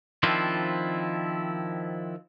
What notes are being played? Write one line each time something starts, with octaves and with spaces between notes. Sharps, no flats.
D#3 F3 C4 D4 E4 F4